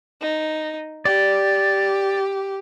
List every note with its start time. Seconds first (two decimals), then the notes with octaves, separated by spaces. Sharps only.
0.21 D#4
1.05 G4 D5